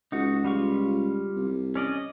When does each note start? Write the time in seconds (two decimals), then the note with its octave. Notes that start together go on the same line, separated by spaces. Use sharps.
0.12 C#2 D#4 F#4
0.44 G3 F4 C#6
1.35 C2
1.75 C#4 D5 D#5